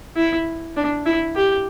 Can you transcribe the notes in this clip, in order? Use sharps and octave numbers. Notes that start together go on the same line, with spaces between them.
E4
D4
E4
G4